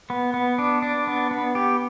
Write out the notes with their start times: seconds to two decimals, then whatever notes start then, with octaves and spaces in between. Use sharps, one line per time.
0.10 B3
0.34 B3
0.58 D4
0.82 D4
1.07 B3
1.31 B3
1.55 G4